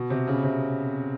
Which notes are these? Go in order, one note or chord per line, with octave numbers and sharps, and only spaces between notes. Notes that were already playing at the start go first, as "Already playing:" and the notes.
Already playing: B2
C3
C#3
C3